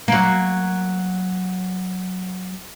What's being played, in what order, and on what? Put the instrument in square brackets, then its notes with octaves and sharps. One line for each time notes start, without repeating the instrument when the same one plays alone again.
[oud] F#3 A#3